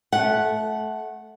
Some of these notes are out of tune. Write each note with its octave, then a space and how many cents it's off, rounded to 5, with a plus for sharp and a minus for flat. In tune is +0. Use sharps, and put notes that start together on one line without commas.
A3 -20 F#5 +0